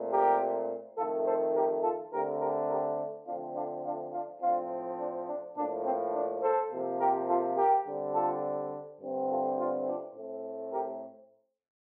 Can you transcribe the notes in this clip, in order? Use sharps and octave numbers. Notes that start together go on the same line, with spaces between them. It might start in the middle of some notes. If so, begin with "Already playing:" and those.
Already playing: A#2 A3 C4
G4 A#4
F2 D#3 A3 F4 A4
A4 C5
G4 A#4
F4 A4
D3 A3 C4 G4 A#4
G4 A#4
G4 A#4
D3 F3 A3 C4 D4 F4
D4 F4
D4 F4
D4 F4
A2 F3 C4 D4 F4
D4
D4
A2 F3 A#3 D4
C4
D4
A4 C5
C3 F3 A#3
G4 A#4
F4 A4
G4 A#4
D3 G3 C4
F4 A4
G2 D3 A3 C4
F4 A4
D4 F4
D4 F4
A2 A3 C4
G4 A#4